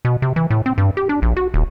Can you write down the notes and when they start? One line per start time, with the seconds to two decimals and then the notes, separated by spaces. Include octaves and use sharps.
0.05 B2
0.22 C3
0.36 E3
0.50 A2
0.66 C4
0.78 G2
0.97 G4
1.09 D4
1.22 A#1
1.37 F#4
1.54 D#1